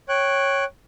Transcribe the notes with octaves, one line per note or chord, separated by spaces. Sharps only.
C#5 G5 F#6